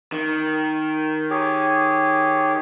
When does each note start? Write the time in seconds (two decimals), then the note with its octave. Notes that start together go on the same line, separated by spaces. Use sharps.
0.12 D#3
1.30 G4 G#4 C#5